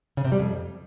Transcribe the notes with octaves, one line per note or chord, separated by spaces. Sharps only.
C#3
C3
G3
F2